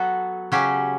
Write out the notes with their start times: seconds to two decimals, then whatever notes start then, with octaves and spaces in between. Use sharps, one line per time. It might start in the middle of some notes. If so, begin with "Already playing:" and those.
Already playing: F#3 B3 F#4 A4
0.52 C#3 F#3 C#4 G4